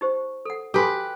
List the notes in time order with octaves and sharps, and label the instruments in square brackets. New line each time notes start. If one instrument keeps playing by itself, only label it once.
[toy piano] D#4 G4 C5
A4 F#5
[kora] G4 B4 [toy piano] A4 G#5 C6